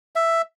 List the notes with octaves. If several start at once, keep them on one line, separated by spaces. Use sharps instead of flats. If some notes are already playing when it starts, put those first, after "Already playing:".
E5